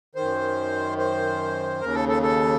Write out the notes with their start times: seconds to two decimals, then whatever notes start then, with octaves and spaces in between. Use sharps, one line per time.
0.15 D#3 C5
0.21 F#2
0.98 C5
1.81 D#2 C#3 A#4
1.94 A4
2.09 A4
2.23 A4